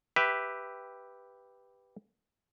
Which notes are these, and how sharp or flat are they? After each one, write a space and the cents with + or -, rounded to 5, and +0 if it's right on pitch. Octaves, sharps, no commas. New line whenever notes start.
G4 +0 B4 +0 E5 +0